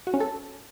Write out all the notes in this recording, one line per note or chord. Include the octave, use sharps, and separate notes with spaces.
F#4
C#4
A4